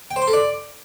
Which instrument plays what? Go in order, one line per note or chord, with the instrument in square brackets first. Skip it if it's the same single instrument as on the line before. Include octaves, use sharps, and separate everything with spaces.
[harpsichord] G5
C5
C6
A4
D5